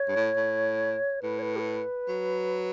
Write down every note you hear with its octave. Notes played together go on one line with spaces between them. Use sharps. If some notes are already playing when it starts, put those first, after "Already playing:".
Already playing: C#5
G2
A2
A2
A2 B4
C#5
B4
G4
B4
F#3